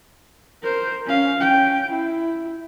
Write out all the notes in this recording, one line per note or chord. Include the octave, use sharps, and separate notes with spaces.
A#4 C5
C#4 F5
C#4 G5
E4